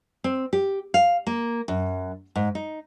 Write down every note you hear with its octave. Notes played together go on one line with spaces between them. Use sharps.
C4
G4
F5
A#3
F#2
G#2
D#4